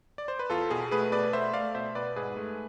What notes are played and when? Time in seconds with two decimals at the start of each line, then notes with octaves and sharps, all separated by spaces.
0.18 D5
0.28 C5
0.39 B4
0.50 E2 F4 A4
0.70 B2 G#4
0.91 A3 G#4 B4
1.12 B2 B4 D5
1.33 A3 C5 E5
1.53 A3 D5 F5
1.75 B2 C5 E5
1.95 B2 B4 D5
2.16 G#2 G#4 B4
2.37 A3